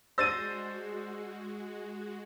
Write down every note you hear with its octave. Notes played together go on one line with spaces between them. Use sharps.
G#3 D4 F#4 C5 E6 A6 A#6 D#7